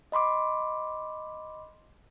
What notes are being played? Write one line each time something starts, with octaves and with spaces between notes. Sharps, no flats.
D#5 B5 C6 D6